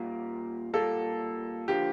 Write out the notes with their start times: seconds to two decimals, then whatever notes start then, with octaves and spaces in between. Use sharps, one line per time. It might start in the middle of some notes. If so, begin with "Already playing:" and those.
Already playing: A#2 G3 A#3
0.74 A#2 G3 A#3 A4
1.68 D3 F3 A#3 G4